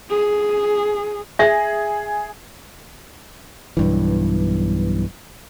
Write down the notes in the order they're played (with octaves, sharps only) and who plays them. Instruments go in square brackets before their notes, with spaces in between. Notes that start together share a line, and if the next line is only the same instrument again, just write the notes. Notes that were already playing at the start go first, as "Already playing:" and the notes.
[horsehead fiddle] G#4
[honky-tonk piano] G#4 [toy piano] E5
[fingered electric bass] B1 G2 E3